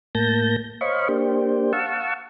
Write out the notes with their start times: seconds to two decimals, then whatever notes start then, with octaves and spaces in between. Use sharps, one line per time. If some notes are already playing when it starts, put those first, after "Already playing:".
0.15 A2 A#3 A5 G6 A#6
0.81 C5 C#5 D#5 F5 B5 C#6
1.09 A#3 D4 G4 C5
1.73 F5 F#5 A5 C#6 E6